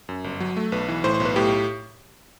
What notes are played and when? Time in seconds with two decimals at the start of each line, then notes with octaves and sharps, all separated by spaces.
0.09 F#2
0.24 G1
0.40 F#3
0.57 A3
0.72 B1 B4
0.88 E3
1.04 A2 C5
1.14 C5
1.20 B1
1.25 B4
1.36 A2 G4